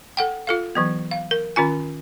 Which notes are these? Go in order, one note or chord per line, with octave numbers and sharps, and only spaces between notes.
A4 F#5 G5
F4 A4 F5
E3 F#3 B3
F5
A#4
D#3 C#4 F4 G#5